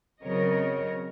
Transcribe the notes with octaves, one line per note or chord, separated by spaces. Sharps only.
C#3 F#3 C4 A#4 C#5 D#5